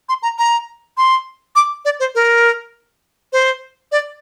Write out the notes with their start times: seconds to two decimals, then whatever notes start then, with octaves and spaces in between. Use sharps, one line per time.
0.09 C6
0.23 A#5
0.38 A#5
0.97 C6
1.56 D6
1.85 D5
2.00 C5
2.15 A#4
3.33 C5
3.92 D5